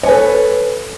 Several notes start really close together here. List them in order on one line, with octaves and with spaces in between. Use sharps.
C#5 G#5 B4 A4